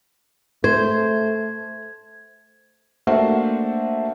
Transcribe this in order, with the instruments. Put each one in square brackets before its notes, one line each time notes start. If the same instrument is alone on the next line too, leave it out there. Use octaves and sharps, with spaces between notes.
[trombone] A3 [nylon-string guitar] C5 [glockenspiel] G#6
[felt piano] A3 A#3 D4 F#4 C5 E5